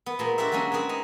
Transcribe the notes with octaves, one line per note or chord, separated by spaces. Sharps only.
B3
A#2 G#3 A#3
D4 F#4 G4 A4 C5 E5
D3 F#3 G#3 A#3 C#4
G#3 B3 C4 G#4
D#4